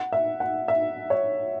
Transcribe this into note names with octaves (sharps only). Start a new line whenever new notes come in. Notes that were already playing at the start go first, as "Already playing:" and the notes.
Already playing: F#5
E5
F#5
E5
C#5